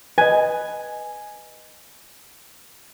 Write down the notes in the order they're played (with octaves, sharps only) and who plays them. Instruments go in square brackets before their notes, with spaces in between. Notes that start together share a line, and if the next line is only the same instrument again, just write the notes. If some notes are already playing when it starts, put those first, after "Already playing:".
[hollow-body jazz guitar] B4 D#5 [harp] G#5